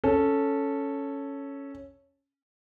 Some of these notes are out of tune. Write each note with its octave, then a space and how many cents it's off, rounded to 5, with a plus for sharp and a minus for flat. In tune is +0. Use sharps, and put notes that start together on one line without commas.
C#4 +0 A4 +0